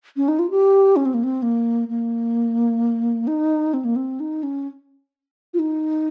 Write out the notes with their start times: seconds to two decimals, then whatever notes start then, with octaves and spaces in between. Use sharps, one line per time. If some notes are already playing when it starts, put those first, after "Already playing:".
0.17 C#4
0.28 D#4
0.39 F4
0.50 G4
0.96 C#4
1.06 C4
1.14 A#3
1.24 C4
1.42 A#3
1.89 A#3
3.27 D#4
3.74 C4
3.85 A#3
3.96 C4
4.20 D#4
4.43 C#4
5.54 F4
5.59 D#4